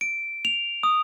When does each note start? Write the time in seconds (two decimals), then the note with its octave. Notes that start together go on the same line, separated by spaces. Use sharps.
0.01 D7
0.45 F7
0.83 D#6